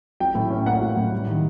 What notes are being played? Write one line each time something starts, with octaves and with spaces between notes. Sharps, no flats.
F#3 G5
A2
C#4
A#3 F#5
F#3
A2
G3
D#3